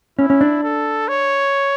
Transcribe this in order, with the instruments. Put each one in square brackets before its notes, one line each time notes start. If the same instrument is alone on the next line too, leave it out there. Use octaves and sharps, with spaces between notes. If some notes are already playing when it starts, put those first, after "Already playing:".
[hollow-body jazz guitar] C#4 [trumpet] E4
[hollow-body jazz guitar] C#4
D4
[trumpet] A4
C#5